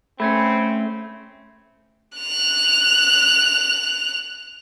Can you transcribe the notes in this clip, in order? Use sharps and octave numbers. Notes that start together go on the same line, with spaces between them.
A3 C4 C#4 B5 G#6 C#7
F#6 F7